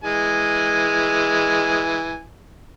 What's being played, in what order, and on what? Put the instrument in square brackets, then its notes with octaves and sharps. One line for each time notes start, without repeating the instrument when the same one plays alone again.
[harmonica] E3 G#3 G#5